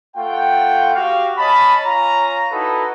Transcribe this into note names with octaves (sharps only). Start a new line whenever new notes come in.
A3 F4 F#5 G5
F#4 G4 F5
C#4 D#5 A5 B5
C#4 F4 A#5
D#4 E4 F#4 A4 B4